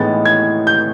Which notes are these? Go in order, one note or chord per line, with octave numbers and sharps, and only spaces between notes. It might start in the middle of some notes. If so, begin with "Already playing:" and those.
Already playing: A2 E3 G#3 B3 D#4 A6
G#6
G6